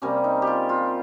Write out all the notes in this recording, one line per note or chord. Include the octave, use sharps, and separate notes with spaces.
C3 G3 A#3 C#4
D#4
G4
F4
F4